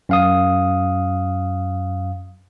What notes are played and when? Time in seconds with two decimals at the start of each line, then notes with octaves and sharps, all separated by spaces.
0.09 F#2 F5 D#6